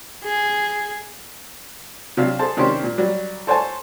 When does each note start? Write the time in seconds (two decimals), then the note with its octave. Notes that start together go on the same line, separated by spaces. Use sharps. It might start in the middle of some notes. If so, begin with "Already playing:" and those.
0.24 G#4
2.17 C3 F#3 D4 F5 F6
2.39 G#4 A4 C5 A5
2.57 C3 D#3 C#4 D4 G4 C5
2.83 A#2
2.98 F#3 G3
3.47 A4 C5 C#5 F#5 G#5 A5